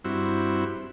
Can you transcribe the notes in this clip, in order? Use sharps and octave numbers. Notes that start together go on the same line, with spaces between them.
G2 C4 E4 F#4